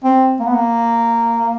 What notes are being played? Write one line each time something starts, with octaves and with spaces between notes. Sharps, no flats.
C4
A#3
B3
A#3